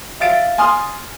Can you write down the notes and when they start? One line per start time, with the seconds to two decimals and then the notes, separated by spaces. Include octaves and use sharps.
0.20 E5 F5 A6 D7
0.58 G#5 C6 D#6 F6